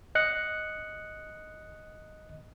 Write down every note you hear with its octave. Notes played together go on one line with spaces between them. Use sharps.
D#5 F#6 C#7